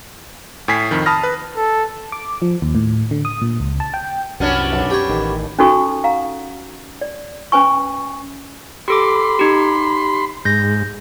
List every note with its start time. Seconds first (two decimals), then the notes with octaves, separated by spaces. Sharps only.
0.68 A2 G#5 B6 C7
0.91 F2 D#3
1.06 A5 B5 D#6 F6 A#6
1.23 B4
1.57 A4
2.12 D6
2.42 F3
2.62 D#2
2.75 A2
3.11 D3
3.25 D#6
3.41 A#2
3.60 C#2
3.80 A5
3.94 G5
4.40 C2 F#2 F#3 B3 C#4 D4
4.73 B1
4.90 G4 C#5
5.10 A1 D#3
5.59 C#4 D#4 F#4 A4 C#6
6.04 F5 F#5 A#5
7.01 D5
7.52 C#4 B4 G#5 C#6
8.88 G4 A4 B5 C6 D6
9.39 D#4 G4
10.45 G#2 G6 A#6